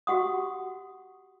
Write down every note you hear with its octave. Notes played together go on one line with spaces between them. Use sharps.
F#4 G4 F#5 C6 D#6